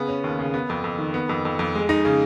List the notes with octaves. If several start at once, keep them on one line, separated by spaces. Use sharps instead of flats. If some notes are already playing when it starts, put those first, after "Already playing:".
Already playing: C#3 B3
C#4
D#2
C#3
B3
F2
F2
D#3
B3
F2
F2
F2
G#3
D#4
C#3